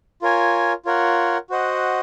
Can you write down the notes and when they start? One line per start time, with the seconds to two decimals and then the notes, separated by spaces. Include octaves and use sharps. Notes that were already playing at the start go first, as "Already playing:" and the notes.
0.22 F4 A#4 C#5 G#5
0.85 F4 A#4 C#5 F#5
1.50 F#4 C5 D#5 F#5